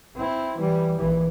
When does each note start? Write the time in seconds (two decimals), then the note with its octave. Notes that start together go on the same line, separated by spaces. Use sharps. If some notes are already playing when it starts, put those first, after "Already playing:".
0.16 C4 E4
0.57 E3 G3
0.98 A#1 E3